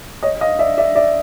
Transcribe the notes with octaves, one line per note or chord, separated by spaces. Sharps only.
C#5 D#5
D#5 F5
D5 E5
D5 E5
D5 E5